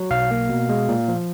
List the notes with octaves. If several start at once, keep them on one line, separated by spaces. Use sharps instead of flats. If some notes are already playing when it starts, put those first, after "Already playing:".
Already playing: F#3
B1 F5
A#3
B2
G#3
A#2
F3